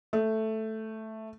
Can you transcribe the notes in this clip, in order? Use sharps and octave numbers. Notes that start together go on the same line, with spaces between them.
A3